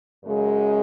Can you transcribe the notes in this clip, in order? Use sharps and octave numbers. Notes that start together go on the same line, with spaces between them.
F#2 C#3 G#3